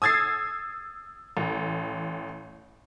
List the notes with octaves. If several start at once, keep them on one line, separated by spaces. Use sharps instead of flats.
D#6 E6 G#6 A6 C7
A1